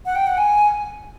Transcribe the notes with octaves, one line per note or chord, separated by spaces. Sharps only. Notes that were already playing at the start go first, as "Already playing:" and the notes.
F#5
G5
F#5
G#5